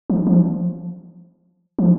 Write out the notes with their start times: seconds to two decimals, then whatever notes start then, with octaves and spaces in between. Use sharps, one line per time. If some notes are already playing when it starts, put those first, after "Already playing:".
0.10 F3
0.27 F3
1.79 F3